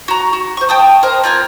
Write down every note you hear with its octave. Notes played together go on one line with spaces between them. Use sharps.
F#4 A#5
F#4
C5 C#6
G5 A5 D#6
A#4 C5 D#5
C4 F4 A#4 G#5